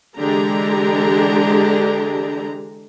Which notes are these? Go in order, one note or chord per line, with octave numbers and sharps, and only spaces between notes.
D3 E3 G#3 D4 G4 A#5